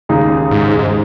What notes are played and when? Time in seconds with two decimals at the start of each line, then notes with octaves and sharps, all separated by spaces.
0.09 D#2 C#3 G#3 D#4 G#4
0.51 G#2
0.79 G#2